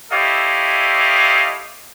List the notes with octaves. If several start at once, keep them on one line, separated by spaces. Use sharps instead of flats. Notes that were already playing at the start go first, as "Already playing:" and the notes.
E4 G4 A4 C#5 D#5 F5